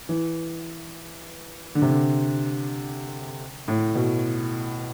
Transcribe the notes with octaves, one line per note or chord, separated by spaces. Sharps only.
E3
D3
C3
D3
A2
B2